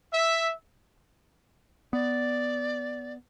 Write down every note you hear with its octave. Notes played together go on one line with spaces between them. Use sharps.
E5
B3 D5